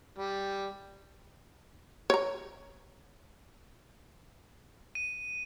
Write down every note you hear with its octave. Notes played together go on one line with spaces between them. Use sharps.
G3
C#5 A#5
D#7